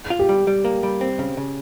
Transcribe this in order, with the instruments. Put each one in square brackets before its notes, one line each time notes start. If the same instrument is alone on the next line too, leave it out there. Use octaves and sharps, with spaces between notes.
[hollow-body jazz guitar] F4
[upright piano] G4
[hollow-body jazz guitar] G3
G3
A#3
G3
C4
C#3
C#3